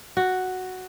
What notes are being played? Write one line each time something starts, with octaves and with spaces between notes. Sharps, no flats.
F#4